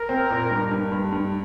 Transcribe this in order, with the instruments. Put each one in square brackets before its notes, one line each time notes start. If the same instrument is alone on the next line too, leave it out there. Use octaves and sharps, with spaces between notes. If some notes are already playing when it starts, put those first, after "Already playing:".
Already playing: [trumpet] A#4
[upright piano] C4
A#2
G2
G2
G2
G2